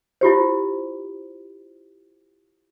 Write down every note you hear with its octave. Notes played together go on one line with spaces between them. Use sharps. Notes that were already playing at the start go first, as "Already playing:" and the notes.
E4 F4 G4 C5